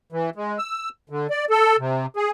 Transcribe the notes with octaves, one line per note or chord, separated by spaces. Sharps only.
E3
G#3
E6
D3
D5
A4
C3
G#4